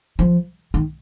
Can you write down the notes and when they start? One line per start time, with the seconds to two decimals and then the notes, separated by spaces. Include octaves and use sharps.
0.19 F3
0.74 D#3